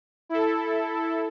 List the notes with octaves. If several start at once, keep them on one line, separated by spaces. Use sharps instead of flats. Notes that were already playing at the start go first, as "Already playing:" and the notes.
E4 A4